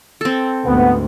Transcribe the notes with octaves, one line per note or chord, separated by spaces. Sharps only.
C4 A4
D2 G#2 B3